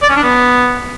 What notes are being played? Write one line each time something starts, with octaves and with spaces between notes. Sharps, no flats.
D5
C#4
D4
B3